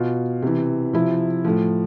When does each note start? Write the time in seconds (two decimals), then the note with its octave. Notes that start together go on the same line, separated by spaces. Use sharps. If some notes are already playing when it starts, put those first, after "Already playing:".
Already playing: B2 F4
0.42 C3 E3
0.93 C3 F3 E4
1.45 A2 F3